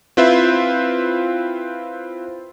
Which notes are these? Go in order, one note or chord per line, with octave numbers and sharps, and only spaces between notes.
C4 E4 F4 B4 C5 E5